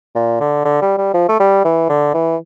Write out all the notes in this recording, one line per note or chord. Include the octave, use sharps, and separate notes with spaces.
A#2
D3
D3
G3
G3
F3
A3
G3
E3
D3
E3